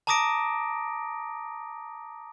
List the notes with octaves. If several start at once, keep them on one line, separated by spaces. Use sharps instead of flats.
A5 A#5 D6 D#6 A#6 D7